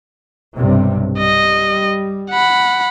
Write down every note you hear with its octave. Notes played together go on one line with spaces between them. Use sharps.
B1 G2 C3
G3 D#5
F#5 B5